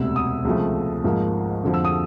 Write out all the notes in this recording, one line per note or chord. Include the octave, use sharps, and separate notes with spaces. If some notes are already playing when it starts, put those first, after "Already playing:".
Already playing: E1 D2 C3 E6
D#6
C#2 C3 F3 A3
G#1 G#2 F3 A#3
F2 D3 F3
E6
D#6